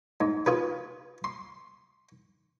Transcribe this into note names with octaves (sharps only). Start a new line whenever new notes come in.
G#2
F4 G#4 B4
C6